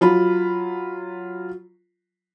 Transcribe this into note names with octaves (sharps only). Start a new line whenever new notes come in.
F#3 F4 B5